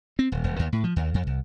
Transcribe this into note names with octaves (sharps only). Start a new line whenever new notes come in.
C4
D#1
D#1
D#2
A2
F3
D#2
F2
C2